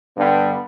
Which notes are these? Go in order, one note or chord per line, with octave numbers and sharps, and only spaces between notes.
G2 D3 G3 B3